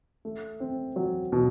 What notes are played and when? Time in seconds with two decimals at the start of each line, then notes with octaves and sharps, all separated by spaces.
0.25 A3
0.60 C4
0.96 F#3
1.32 B2